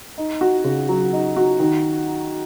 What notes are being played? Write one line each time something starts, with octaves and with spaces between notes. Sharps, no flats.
D#4
F#4
C#3
F#3
D#4
F#4
D#3